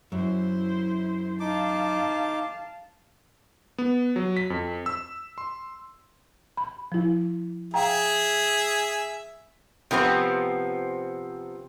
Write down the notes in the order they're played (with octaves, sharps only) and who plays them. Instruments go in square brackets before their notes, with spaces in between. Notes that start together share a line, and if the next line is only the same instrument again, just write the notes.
[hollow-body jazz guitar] F#2 [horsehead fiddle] E4 C5
[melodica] D#4 D6 [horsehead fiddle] F5 A5
[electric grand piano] B3
F#3
B6
F2
E6
C6
[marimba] B5
F3 E4
[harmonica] G#4 E5 [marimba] F5 G5 A#5
[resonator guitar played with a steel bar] C3 F3 B3 C4